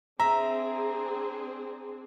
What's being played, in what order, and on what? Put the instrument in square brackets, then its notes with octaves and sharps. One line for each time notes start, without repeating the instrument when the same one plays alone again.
[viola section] C4 D4 G#4 [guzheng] E5 [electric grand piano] A#5